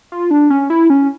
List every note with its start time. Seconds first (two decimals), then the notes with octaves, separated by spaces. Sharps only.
0.12 F4
0.31 D4
0.50 C#4
0.70 E4
0.90 C#4